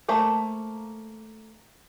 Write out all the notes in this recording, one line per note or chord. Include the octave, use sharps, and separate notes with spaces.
A3 A#3 C5